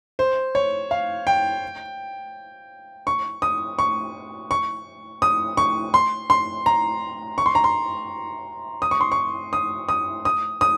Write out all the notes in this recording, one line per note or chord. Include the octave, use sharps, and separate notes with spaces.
C5
C#5
F5
G5
C#6
D#6
C#6
C#6
D#6
C#6
C6
C6
A#5
C#6
C6
A#5
C6
D#6
C#6
C6
C#6
D#6
D#6
D#6
D#6